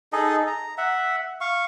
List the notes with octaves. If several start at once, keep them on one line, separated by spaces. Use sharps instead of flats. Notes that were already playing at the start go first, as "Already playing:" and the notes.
D#4 G#4 A4 D#5
A#5
E5 F#5
F5 C#6